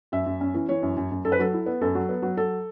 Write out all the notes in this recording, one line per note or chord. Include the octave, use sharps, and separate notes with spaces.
F#2 E5
F#2
C#4
E3
E3 C#5
F#2
F#2
F#2
F#2 A4
B4
F#3 A4
E4
B3
F#2 A4
F#3
B3
F#3
F#3 A4